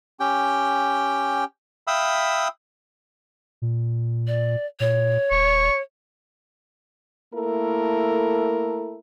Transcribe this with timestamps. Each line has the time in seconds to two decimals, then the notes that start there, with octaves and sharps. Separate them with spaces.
0.20 C#4 G4 G5
1.87 E5 F5 G5 B5 D#6 E6
3.62 A#2
4.27 D5
4.80 A#2 C#5
5.31 D#1 C#6
7.33 A3 A#3 E4 A4 A#4